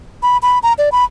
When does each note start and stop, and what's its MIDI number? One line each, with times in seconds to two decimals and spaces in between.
0.23 0.37 83
0.43 0.59 83
0.63 0.73 82
0.78 0.89 74
0.92 1.04 83